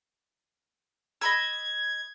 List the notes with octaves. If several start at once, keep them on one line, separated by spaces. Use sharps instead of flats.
D#5 B5 E6 G#6